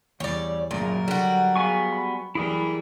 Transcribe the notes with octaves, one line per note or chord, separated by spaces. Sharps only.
E2 G3 C#5 D5
G#1 F#2 A#2 C#3 F#3 A#4
D3 G3 F#4
B3 G#4 F5 G#5 C#6
B5
F#1 E3 G3 E4 G#4 A#4